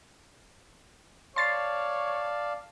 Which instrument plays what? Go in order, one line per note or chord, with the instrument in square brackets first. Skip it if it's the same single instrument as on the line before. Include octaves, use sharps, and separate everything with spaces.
[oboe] C#5 [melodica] D5 F5 A5 [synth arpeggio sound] C6 A6 C7